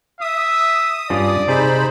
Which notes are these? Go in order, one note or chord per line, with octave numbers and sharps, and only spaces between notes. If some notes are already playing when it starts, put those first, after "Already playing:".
E5 D#6
G2 C#4 F4 D5
C3 D#4 G#4 C5 B5